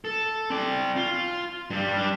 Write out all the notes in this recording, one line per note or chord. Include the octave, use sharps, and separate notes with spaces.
A4
C4 D5
F4
G2 G3
G3 D4